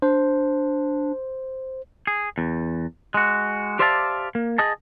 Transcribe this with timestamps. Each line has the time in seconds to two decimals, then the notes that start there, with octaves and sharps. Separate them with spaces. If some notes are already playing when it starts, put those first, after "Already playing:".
0.02 D4 C5
2.07 G#4
2.38 E2
3.14 G#3 F#4
3.79 G4 C5 D5 E5 F5 A5
4.35 A#3
4.58 G#4 D#5 A5